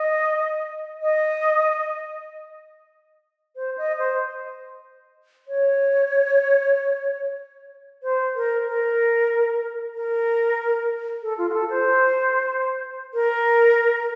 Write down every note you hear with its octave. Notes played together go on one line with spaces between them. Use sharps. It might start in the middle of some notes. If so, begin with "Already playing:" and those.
Already playing: D#5
D#5
C5
D#5
C5
C#5
C5
A#4
A#4
A#4
A4
F4
F#4
A4
C5
A#4